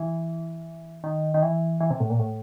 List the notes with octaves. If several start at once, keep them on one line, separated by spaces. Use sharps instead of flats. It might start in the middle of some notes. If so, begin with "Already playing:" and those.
Already playing: E3
D#3
D#3
E3
E3
C3
A2
A#2
A2